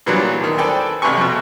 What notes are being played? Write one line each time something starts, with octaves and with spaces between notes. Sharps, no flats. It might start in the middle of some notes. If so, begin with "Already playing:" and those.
A#2 E3 F#3 G3 B3 D4
D2 D#3
A4 B4 C5 D5 G5 G#5
A1 C3 B4 G#5 C#6
F2 B2